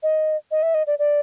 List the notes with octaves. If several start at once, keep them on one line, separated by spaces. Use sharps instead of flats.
D#5
D#5
E5
D#5
D5
D5